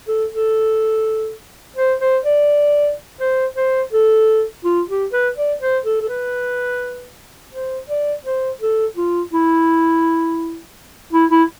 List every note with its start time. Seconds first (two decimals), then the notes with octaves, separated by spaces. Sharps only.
0.08 A4
0.32 A4
1.76 C5
2.00 C5
2.25 D5
3.20 C5
3.57 C5
3.93 A4
4.65 F4
4.89 G4
5.13 B4
5.37 D5
5.61 C5
5.85 A4
6.01 A4
6.09 B4
7.53 C5
7.89 D5
8.25 C5
8.61 A4
8.97 F4
9.33 E4
11.13 E4
11.31 E4